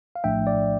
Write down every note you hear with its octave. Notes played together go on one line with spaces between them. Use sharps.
F5
A#1 A2 F3 A3 D4 E5 G5
D5